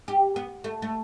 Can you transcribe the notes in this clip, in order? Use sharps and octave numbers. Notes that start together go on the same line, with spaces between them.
G4
B3
A3
A3